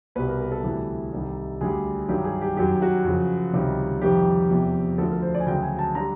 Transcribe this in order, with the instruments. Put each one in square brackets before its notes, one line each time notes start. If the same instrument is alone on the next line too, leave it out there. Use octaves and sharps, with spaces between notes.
[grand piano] C2 B2 G3 B4
A#4
A#4
A4
D2 C3 E3 G3
C2 C3 D#3 G3
D2 D3 G3 G#4
G2 D#3 F#3 G4
G#4
G4
F#2 D#3 F#3 G4
F#4
F#2 C#3 F3
C#2 C3 D#3 G3
F2 C3 D#3 G3 G4
E2 C3 F3
D2 D3 F3 A4
A#4
C5
D5
G#5
D2 C#3 F#3 G5
G#5
A5
D3 G3 A#5